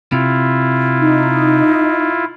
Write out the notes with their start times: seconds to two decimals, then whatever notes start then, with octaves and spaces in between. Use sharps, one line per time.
0.12 C3 E4 F4
0.99 D#4